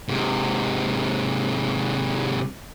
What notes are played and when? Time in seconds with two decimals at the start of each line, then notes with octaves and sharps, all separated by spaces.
0.09 G#2 C3